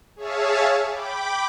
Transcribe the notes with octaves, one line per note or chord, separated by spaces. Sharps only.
G#4 C#5 E5 F5 A5
G5 B5 D6